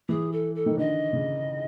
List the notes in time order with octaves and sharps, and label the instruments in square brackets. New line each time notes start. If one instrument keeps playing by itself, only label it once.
[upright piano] E3 [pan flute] G#4
[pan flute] A4
A4
[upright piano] D#3
[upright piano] D3 [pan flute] D#5
[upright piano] C#3